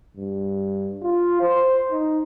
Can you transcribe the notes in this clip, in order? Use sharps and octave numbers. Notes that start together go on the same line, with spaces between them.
G2
F4
C5
D#4